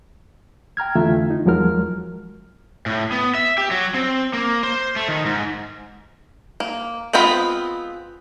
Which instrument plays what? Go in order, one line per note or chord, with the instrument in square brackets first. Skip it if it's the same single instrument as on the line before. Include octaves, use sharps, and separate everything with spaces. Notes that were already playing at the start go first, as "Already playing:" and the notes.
[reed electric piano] G5 A#5 F6 G#6
F2 D3 E3 A3 F4 E5
D#4
E2 F3 F#3 G#3 A#4 F6
[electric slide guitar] A2
B3
E5
G4
F#3
C4
A#3
C5
A3
D#3
G#2
[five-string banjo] A#3
G#3 B3 C4 F4 B5